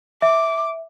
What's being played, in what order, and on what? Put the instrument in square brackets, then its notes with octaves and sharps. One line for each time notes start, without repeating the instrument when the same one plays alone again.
[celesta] E5 [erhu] D6